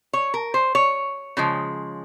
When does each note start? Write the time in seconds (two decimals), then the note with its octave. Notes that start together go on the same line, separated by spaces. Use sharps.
0.13 C#5
0.34 A#4
0.54 C5
0.75 C#5
1.37 C#3 F3 G#3